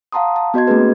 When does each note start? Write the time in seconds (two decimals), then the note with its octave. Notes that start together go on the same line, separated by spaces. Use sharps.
0.12 F5 F#5 A5 A#5 C6 D#6
0.36 A5
0.54 B3 F#4 D#5 C6 G#6
0.68 A3 A#3 C#4 G#4 B4